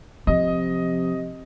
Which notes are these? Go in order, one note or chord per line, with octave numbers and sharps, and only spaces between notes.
C3 F3 D#5